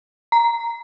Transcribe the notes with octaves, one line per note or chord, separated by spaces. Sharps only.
A#5